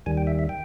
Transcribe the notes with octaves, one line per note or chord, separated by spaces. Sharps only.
D#2 D#3 G3 G#5
G5
E5
E5
G5